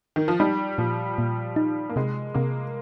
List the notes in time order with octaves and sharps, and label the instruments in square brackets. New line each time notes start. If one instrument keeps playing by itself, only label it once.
[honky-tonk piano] D#3
F3
[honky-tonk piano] G3 [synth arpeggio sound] D#4
[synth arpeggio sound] A#2 [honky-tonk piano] F3
[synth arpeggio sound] A#2
D#4
[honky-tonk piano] A#3
[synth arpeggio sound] C3 [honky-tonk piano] G#3
[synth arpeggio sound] C3 [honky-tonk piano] A#3